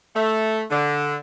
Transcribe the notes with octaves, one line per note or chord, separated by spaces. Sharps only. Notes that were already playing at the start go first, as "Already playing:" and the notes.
A3
D3